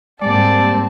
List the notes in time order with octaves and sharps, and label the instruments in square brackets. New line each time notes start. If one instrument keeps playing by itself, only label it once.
[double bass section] G#2 G3 A#3 [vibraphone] G#3 [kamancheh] C4 A5 [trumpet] D5